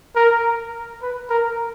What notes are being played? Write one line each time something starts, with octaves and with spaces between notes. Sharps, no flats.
A#4
B4
A#4